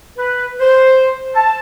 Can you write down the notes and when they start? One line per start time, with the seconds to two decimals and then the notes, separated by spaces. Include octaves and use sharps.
0.17 B4
0.60 C5
1.35 A5